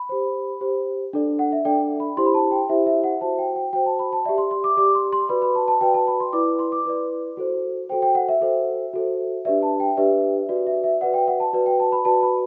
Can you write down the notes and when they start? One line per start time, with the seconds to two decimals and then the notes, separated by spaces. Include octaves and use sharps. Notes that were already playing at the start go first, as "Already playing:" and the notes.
Already playing: B5
0.09 G4 C5
0.61 G4 C5
1.13 D4 A4 D5
1.39 F#5
1.52 E5
1.65 D4 A4 D5 G5
2.00 B5
2.17 E4 G4 C5 C6
2.26 B5
2.34 A5
2.52 G5
2.69 E4 G4 C5 E5
2.86 E5
3.04 F#5
3.21 F#4 C5 A5
3.39 G5
3.56 G5
3.73 F#4 C5 G5
3.86 A5
3.99 B5
4.13 A5
4.25 G4 D5 E5
4.38 C6
4.51 C6
4.64 D6
4.77 G4 D5 D6
4.95 C6
5.12 C6
5.29 F#4 B4 D5 B5
5.42 B5
5.55 A5
5.68 A5
5.81 F#4 B4 D5 G5
5.94 A5
6.07 B5
6.20 C6
6.33 E4 B4 D5 D6
6.59 C6
6.72 D6
6.85 E4 B4 D5
7.37 F#4 A4 C5
7.89 F#4 A4 C5 G5
8.02 G5
8.15 F#5
8.29 E5
8.41 F#4 A4 C5
8.94 F#4 A4 C5
9.45 D4 G4 B4 D5 E5
9.62 A5
9.80 G5
9.97 D4 G4 B4 D5 E5
10.49 F#4 B4 D5
10.67 E5
10.84 E5
11.01 F#4 B4 D5 F#5
11.14 G5
11.28 F#5
11.40 A5
11.53 F#4 B4 D5
11.66 G5
11.80 A5
11.92 B5
12.05 F#4 B4 D5 A5
12.23 B5